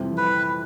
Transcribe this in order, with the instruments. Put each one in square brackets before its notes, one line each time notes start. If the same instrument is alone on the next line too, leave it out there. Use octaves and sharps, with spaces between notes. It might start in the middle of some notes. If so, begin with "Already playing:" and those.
Already playing: [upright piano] F2 C3 E3 G3 C4
[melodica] B4